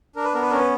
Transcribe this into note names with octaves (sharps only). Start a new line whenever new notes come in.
D4 A#4
B4
B3 A#4
B4
C#4 A#4
B4